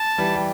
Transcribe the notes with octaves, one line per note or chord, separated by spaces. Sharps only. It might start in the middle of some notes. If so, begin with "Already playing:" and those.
Already playing: A5
E3 G3
G3